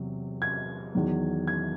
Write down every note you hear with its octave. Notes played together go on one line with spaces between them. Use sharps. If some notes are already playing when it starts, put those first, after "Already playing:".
Already playing: E2 C3 F#3
G#6
E2 D#3 F#3
G#6